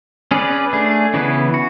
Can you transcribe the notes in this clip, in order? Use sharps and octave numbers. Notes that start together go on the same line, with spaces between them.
C#4 G#4 B4 D5
A3 D4 G#4
C#3 E3 B3 E4
F#4